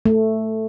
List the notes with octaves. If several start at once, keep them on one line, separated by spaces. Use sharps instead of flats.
A3